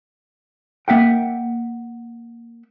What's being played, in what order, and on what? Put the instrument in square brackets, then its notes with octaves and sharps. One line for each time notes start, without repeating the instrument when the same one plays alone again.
[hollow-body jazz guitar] A#3 E5 F#5 G5